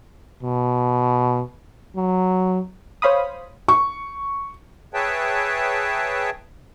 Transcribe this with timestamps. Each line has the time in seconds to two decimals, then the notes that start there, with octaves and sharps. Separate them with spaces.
0.43 B2
1.96 F#3
3.02 C5 C#5 F5 B5 D#6
3.68 C#6
4.94 G#4 B4 C#5 E5 G5 A5